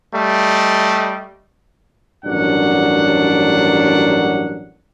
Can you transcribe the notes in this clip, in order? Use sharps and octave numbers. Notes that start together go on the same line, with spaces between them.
G3 A3 D#5
A1 G2 D#3 F#3 D4 F#5